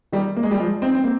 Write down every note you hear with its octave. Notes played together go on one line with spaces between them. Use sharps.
D#3 G3
A#3
G#3
G3
F3 G#3
C4 D#4
C4
A#3